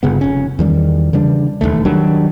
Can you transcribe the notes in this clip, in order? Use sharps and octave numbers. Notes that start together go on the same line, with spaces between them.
G1 C#3 B3
F1 C#4
E2 D#3 G3
C#3 E3 G3 D4
E1 A#1 D#2 A3
D#3 F#3 G3 D4